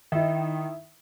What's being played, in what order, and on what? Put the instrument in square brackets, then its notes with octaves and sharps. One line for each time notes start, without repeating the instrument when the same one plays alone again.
[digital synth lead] D#3 [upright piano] E4 E5